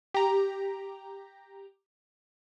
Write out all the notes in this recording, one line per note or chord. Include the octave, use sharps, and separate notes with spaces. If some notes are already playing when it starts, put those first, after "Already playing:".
G4 A#5